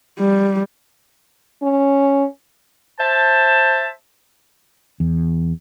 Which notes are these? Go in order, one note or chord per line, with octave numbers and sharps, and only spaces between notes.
G3
C#4
C5 E5 A5
E2